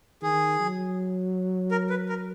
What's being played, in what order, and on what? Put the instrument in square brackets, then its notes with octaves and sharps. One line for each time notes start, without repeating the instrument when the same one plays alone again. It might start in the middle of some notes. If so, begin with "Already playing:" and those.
[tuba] D#3 [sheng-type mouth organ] G#4
[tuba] F#3
[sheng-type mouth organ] A#4
B4
A#4